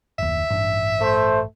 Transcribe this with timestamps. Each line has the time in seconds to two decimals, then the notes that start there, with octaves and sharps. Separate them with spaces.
0.19 F#1 D#2 E5
0.50 A1 G2 D4
1.01 A3 C5